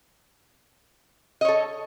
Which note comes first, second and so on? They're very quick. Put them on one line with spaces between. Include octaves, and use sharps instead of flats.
D#5 C#5 A4